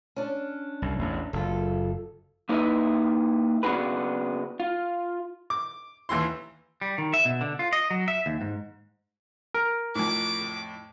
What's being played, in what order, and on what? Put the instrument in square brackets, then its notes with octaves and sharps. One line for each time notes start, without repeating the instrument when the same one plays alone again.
[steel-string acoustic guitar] C#4 D4
[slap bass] C2
A1 E2
[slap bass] F#1 [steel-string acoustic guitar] F4 A4
[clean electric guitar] A#3 D#4 E4 B4 D#5 E5
C#3 B3 D4 F#4 G#4 B4
F4
[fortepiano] D6
D#2 E3 E4 C6
[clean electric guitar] G3
D#3
E5
B2
D3
F4
D#5
F#3
E5
D#2
G#2
[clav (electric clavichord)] A#4
[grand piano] F2 A2 [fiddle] D6